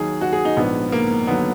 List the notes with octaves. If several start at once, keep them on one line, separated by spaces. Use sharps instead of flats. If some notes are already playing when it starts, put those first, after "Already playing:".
Already playing: D#2 D#3 F#3 G#4
F#4
G#4
D#4
A#1 G#2 F3 B3
A#3
D#2 D3 F#3 B3